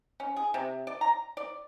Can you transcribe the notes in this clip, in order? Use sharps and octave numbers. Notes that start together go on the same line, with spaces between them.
C#4
G#4
C3
D5
A#5
D5